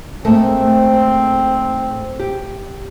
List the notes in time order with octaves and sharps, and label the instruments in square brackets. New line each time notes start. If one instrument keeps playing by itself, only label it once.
[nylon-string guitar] G#2 A3 A#3 [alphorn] C4
[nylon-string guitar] G4